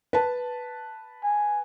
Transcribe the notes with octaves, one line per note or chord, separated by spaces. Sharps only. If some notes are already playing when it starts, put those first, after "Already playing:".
B4 A5
G#5